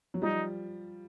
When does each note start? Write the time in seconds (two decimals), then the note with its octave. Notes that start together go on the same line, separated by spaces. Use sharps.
0.14 F#3
0.22 F3 G3 D#4